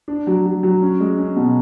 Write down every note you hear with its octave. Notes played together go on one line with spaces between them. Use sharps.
D4
F#3
F#3
F#3
C#4
G#3
C#4
B2